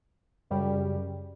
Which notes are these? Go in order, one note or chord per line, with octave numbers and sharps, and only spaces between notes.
F#2 C#3 G3